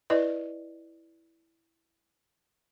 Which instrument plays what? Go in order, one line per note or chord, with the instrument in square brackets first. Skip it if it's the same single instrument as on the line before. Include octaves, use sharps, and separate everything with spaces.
[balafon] E4 B4 D5 D#5